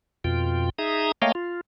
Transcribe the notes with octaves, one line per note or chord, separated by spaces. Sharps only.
F2 B2 F4 G5
D#4 G#4 E5 A#5 D#6
A3 A#3 C#5 D#5 F5 G5
F4